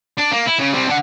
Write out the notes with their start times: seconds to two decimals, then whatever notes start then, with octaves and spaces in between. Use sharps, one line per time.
0.17 D4
0.31 A#3
0.46 E4
0.59 C#3
0.72 G3 C4
0.88 D4 F#5